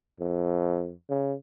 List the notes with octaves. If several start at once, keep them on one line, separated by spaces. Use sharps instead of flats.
F2
C#3